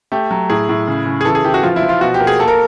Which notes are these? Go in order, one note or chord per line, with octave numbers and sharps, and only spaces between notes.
A3 G4
F#3
A2 G#4
A2
C#3
C#3
G#4
E3 A4
G#4
E3 G4
F#4
F3 F4
E4
F3
F4
B2 F#4
G4
A#3
G#4
A#3 A4
A#4